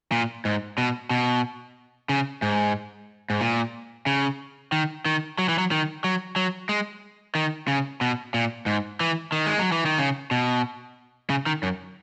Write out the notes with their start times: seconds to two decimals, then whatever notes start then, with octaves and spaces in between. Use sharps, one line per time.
0.12 A#2
0.45 G#2
0.78 B2
1.10 B2
2.09 C#3
2.42 G#2
3.30 G#2
3.41 A#2
4.06 C#3
4.72 D#3
5.05 D#3
5.38 F#3
5.49 E3
5.58 F#3
5.71 D#3
6.04 F#3
6.36 F#3
6.69 G#3
7.35 D#3
7.68 C#3
8.01 B2
8.34 A#2
8.66 G#2
9.00 E3
9.32 D#3
9.46 G#3
9.59 F#3
9.72 E3
9.86 D#3
9.98 C#3
10.31 B2
11.30 C#3
11.46 D#3
11.63 F#2